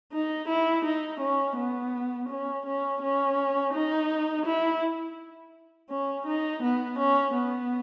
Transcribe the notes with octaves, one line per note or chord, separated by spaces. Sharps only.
D#4
E4
D#4
C#4
B3
C#4
C#4
C#4
D#4
E4
C#4
D#4
B3
C#4
B3